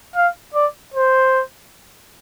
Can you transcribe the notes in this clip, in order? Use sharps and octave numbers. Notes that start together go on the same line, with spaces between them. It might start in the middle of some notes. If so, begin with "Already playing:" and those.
F5
D5
C5